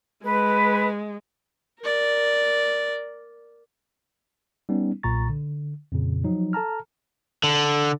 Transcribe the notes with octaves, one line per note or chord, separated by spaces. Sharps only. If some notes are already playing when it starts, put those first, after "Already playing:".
G#3 B4
A#4 D5
G3 B3 C#4 D#4
B1 A#2 A#5 C#6 A6
D3
F2 A#2 C#3
F3 F#3 D#4
A4 A5 A#5 F6
D3